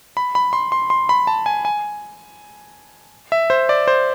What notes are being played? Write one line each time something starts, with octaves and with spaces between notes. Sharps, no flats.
B5
B5
C6
C6
C6
B5
A5
G#5
G#5
E5
C5
D5
C5